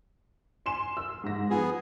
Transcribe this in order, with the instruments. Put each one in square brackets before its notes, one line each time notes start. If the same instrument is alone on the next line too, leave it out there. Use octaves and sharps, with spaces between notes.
[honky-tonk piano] G#5 C6 E7
E6
G#2 A#6
[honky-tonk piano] F3 [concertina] B3 G#4